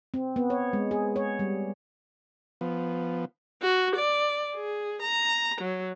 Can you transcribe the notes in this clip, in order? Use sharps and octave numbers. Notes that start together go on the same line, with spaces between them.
C4
B3
C#5
G#3
G#4
C#5
G3
F3 B3
F#4
D5
G#4
A#5
F#3